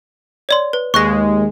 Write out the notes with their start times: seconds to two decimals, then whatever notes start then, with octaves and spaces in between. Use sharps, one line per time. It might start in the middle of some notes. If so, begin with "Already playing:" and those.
0.49 C#5 D5 C6
0.73 B4
0.94 D#2 G#3 C#6 F#6 A#6